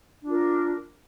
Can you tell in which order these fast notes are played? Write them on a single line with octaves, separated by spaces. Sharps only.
D4 F4 A#4